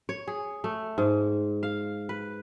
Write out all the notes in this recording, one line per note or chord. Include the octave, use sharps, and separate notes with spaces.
C#5
G#4
A3
G#2
F5
B4